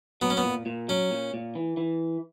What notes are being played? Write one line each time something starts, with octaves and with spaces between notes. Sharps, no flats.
F#3 B3
C#4
B3
A#2
A#2
F#3 C#4
A#2
A#2
E3
E3